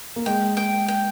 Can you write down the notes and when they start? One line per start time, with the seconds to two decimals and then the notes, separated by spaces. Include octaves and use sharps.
0.16 A#3
0.26 G#3 G5
0.57 G5
0.88 G5